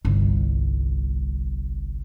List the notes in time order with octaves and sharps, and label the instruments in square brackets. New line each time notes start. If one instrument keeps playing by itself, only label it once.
[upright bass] G1 C2